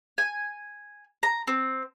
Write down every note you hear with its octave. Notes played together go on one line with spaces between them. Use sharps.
G#5
A#5
C4